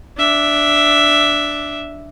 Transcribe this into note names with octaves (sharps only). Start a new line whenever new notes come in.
D4 E5